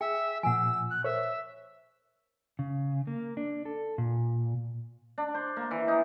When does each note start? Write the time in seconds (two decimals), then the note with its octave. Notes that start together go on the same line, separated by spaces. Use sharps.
0.01 G#4 E5 G5
0.43 A#2 F3 F#5 G#5 E6
0.90 F#6
1.04 A#4 C5 C#5 E5
2.59 C#3
3.07 A#3
3.37 D4
3.65 A4
3.98 A#2
5.18 D4
5.34 C5
5.57 A#3
5.71 E3
5.88 D#4